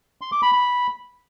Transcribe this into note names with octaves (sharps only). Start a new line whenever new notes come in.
C6
D6
B5
B5